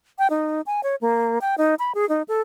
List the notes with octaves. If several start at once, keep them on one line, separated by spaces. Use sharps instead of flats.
G5
D#4
G#5
C#5
A#3
G5
D#4
B5
G#4
D#4
A4